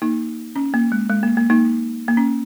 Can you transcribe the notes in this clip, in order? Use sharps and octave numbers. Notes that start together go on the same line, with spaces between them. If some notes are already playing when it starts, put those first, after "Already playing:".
A#3 D#4
C#4
A#3
G#3
G#3
A#3
A#3
A#3 D#4
A#3
C#4